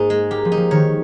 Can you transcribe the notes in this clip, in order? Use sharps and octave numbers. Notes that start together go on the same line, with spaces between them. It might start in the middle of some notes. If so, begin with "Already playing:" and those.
Already playing: G#2 A#3 D#4
G#3
A#3 G4
F3
D#4
F3
D#3 C#5